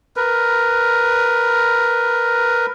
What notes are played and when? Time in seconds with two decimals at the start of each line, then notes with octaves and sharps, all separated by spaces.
0.16 A#4 B4